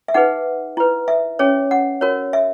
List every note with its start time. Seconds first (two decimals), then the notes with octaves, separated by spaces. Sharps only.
0.08 E5
0.14 D#4 G#4 B4 F#5
0.77 E4 B4
1.08 E5
1.39 C#4 G#4 C#5
1.71 F#5
2.01 F#4 A#4 C#5
2.33 E5